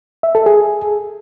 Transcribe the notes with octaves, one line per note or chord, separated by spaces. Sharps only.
E5
A4
G#4